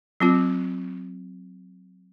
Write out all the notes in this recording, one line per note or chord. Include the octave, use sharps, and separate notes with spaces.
F#3 C4 F4